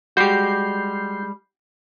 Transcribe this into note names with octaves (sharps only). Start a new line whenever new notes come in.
G3 G#3 F#4 G4 G6 C7